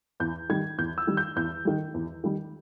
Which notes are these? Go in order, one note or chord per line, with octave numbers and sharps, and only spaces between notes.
E2 G6
D#3 G3 G#6
E2 G6
E6
D#3 G3
G6
E2 G6
D#3 G3
E2
D#3 G3